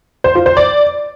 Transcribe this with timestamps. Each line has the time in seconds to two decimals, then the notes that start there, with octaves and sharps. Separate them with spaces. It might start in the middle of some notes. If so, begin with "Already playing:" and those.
0.24 C5
0.35 F4
0.46 C5
0.57 D5